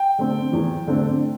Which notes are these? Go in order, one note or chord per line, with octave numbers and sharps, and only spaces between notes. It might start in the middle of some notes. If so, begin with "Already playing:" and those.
Already playing: G5
D3 A3 C4
E2
D3 A3 C4